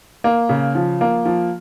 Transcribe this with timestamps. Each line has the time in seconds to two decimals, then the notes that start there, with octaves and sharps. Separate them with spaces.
0.24 A#3
0.49 C#3
0.75 F3
1.01 A#3
1.25 F3